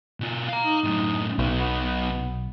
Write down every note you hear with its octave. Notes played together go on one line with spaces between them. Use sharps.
B2 F4
F5 A#5
D#4
F#2 A2
B1 B2 D#4
B3